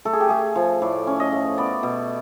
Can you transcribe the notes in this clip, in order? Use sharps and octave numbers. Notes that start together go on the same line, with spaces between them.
A3 A4
G#4
G4
A3 G#4
F3
A2 D5
C#4
D#5
A3
B3 D5
B2